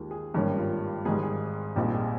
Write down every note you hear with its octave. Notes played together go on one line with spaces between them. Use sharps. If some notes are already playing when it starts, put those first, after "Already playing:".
Already playing: D#2 D#3 G#3 F4 G4
G#4
G#1 G2 D#3 A#3 C#4 G4
F4
G#1 G#2 D#3 G3 G#4
G#4
A#1 A#2 G3 C4 D#4 G4
G#4